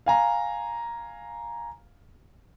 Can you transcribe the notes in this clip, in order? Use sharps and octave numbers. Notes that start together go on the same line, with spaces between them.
F5 G#5 A#5